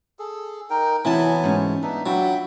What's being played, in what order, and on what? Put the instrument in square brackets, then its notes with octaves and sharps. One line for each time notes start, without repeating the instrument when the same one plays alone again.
[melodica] G#4 A4
D#4 A#4 G5
[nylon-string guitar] C3 C4 E4 [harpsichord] E3 A5 [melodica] F#3 B3 G#5
[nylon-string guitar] D2 G#2 C#4
[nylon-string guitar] B3 [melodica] D4 D#4 E5
[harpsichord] F#3 [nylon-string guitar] D4 F4 [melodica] E5 G5 B5